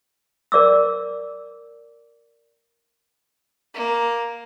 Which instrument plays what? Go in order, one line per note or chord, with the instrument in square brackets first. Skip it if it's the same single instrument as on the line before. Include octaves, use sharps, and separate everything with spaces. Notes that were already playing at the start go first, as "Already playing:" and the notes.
[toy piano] A#4 D5 D6 E6
[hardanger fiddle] A#3